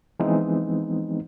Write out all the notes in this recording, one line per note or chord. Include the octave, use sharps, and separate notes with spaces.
E3 F3 G#3 B3 C4 D#4